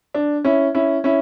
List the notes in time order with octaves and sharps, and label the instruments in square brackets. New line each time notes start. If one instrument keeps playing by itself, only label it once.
[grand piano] D4
C#4 E4
C#4 E4
C#4 E4